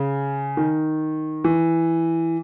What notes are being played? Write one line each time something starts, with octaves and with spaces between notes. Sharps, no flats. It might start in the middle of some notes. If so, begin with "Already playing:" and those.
Already playing: C#3
D#3
E3